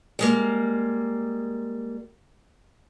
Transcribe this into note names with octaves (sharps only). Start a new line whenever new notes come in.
G3 G#3 A#3